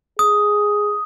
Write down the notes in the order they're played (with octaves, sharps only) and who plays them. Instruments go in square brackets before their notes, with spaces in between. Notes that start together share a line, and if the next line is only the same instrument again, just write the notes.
[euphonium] G#4 [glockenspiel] D#6